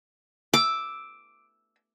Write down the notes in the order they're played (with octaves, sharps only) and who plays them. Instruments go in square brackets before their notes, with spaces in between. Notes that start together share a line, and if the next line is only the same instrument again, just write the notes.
[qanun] D6 [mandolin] E6